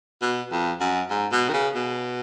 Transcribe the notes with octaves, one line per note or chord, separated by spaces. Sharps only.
B2
F2
F#2
G#2
B2
D#3
C#3
B2